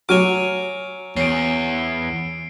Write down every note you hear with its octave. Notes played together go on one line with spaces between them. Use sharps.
F#3 F#4 C#5 G#5 D6 F6
E2 C#4 C7 D7